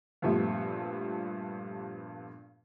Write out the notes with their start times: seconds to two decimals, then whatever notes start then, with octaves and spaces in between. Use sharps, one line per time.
0.22 G2 A#2 F3 G3 A3 B3